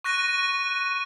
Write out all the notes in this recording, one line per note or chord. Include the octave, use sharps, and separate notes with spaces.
C#6 F#6 A#6 D#7